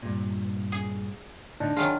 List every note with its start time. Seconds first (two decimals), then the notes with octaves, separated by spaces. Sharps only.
0.02 G2 A#2
0.72 G#4
1.60 A2 D3 D4 D#4
1.77 D#3 F#3 F4 G#4